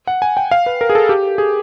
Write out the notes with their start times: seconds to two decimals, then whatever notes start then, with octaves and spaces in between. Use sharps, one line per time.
0.07 F#5
0.22 G#5
0.37 G5
0.51 F5
0.66 B4
0.81 A#4
0.90 G#4
0.95 A4
1.09 G4
1.38 G#4